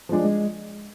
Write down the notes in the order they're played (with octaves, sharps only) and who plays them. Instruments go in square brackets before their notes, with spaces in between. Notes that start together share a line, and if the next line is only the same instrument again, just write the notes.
[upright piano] F3 G#3 D4
[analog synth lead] G#3